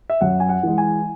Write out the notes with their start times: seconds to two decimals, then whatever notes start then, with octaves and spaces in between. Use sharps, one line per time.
0.10 E5
0.21 F#2 F#5
0.40 G#5
0.49 F#5
0.63 E3 G#3
0.78 G#5